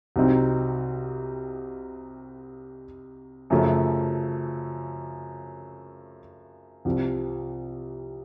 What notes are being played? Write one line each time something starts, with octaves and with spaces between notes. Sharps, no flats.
C2 C3 F#3 C4 D#4
F#2 C#3 F3 A3
C2 C3 F3